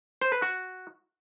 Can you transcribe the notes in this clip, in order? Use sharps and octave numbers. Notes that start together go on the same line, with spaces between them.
C5
B4
F#4